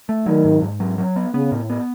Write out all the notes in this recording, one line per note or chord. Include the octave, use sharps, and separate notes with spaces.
A3
D#3 F#3
G#2
G#2
F#3
F#3
B3
C#3 B3
A2
B3